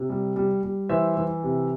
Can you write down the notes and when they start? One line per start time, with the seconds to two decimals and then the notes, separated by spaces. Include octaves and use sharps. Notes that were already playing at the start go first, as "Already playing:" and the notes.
Already playing: C3
0.09 G3
0.36 G3
0.63 G3
0.89 E3 C5 E5
1.16 E3
1.43 C3